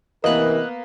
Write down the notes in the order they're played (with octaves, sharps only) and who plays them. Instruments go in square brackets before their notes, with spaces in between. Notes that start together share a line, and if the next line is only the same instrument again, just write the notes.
[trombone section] C3 E3 A#4 [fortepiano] A#3 B3 [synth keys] D#5 F#6